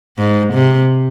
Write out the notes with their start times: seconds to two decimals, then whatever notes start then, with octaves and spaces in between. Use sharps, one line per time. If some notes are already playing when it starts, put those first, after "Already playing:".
0.18 G#2
0.54 C3